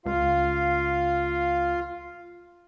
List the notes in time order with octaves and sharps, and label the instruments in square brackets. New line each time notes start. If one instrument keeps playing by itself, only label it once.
[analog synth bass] C#2 [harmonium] F4 F5